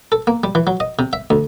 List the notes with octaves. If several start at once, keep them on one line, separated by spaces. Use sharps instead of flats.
A4
A#3
G3
E3
F#3
D#5
C3
E5
D2